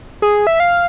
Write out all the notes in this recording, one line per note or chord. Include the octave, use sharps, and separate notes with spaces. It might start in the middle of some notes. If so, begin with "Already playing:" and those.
G#4
E5
F5